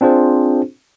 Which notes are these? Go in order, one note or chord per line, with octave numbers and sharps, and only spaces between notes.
C4 D4 F4 G#4 C5